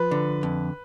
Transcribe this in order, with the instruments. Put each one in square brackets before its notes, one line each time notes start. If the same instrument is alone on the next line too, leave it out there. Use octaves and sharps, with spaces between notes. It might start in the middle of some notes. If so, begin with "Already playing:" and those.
Already playing: [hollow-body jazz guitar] F3 [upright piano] B4
[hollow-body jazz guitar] D3
F2